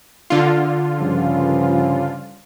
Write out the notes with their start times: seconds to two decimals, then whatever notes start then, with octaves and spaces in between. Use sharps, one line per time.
0.30 D3 F4
1.00 G2 C#3 F3